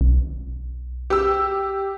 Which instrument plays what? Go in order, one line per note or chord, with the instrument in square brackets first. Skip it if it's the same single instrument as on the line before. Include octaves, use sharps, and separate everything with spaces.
[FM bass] B1
[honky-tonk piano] G4 E6